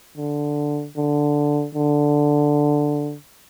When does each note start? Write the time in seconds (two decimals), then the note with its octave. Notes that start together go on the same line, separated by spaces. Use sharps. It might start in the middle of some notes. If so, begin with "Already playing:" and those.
0.17 D3
0.96 D3
1.75 D3